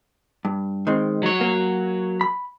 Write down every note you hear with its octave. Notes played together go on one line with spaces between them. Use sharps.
G2
D#3 G#3 C4
F#3 C#5
A#3
B5